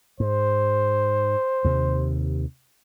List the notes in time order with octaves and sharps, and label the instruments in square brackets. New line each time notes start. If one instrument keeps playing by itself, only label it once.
[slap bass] G#2 [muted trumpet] C5
[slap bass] D#2 C3